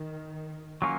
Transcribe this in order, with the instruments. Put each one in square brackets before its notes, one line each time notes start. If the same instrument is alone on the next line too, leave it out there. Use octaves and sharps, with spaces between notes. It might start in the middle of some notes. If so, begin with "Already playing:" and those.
Already playing: [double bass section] D#3
[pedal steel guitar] F#3 A#3 C#4 F4